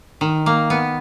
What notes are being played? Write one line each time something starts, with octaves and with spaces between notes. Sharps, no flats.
D#3
A#3
B3